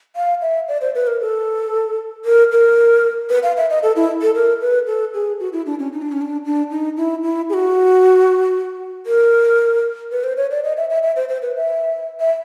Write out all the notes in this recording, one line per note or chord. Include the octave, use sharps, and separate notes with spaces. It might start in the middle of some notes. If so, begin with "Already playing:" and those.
F5
E5
D5
C5
B4
A#4
A4
A#4
A#4
B4
F5
E5
D#5
A4
E4
A4
A#4
B4
A4
G#4
F#4
E4
D4
C#4
D#4
D4
C#4
D4
D4
D#4
E4
E4
G#4
F#4
A#4
B4
C5
C#5
D5
D#5
E5
E5
E5
C5
C5
B4
E5
E5